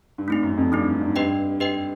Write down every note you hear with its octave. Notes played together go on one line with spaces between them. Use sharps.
G2
G#2 A3 C4 D#4
F#2
F2
G2 A3 C4 D#4
G#2
G#2
G2 G4 B4 D#5 G5
G4 B4 D#5 G5